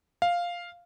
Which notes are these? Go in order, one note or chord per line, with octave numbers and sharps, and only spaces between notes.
F5